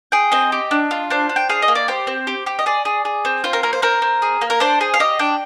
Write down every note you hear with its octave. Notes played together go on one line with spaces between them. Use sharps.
G#4 G5
C4 D#5
G4
D4
F4
D4 C5
D4
G5
G#4 F5
D#5
A#3
D5
G4 C5
C4
G4
G4
D#5
G#4 D5
G#4
G#4
C4
F4 C5
A#4
A#3 A#4
C5
C4 A#4
C4
G#4
A#3
A#4
D4 C5
G#4
F5
G4 D#5
D4 G5